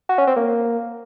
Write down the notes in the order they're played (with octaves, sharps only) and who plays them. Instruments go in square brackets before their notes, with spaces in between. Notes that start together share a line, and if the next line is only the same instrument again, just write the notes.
[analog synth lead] F#4
C#4
C4
A#3